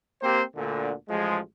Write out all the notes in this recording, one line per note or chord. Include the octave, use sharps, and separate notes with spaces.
A#3 C4 G4 C5
D2 A#2 D3
A1 F3 G#3